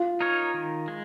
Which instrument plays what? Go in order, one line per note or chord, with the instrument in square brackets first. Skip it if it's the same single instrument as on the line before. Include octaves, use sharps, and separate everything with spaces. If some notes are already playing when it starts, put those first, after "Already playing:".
Already playing: [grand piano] F4
[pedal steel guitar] D#4 A#4 C#5
D#3
G#3